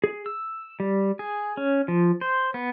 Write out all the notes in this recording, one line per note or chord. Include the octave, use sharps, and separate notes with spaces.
G#4
E6
G3
G#4
C#4
F3
C5
B3